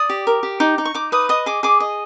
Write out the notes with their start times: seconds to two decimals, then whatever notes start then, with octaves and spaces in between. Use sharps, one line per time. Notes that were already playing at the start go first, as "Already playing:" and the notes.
Already playing: D5 D#6
0.10 G4
0.27 A#4
0.43 G4
0.60 D#4 D6
0.78 D#4
0.85 C#6
0.94 D#4 D6
1.12 B4 D#6
1.29 D#5 D#6
1.46 G#4 D6
1.63 G#4 D6
1.80 D#5